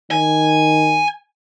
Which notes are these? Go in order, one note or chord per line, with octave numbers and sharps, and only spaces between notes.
D#3 G#5